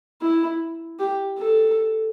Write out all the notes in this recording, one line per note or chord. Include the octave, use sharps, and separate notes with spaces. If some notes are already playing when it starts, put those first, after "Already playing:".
E4
G4
A4